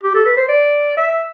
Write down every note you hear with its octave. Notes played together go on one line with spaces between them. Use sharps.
G4
A4
B4
C5
D5
E5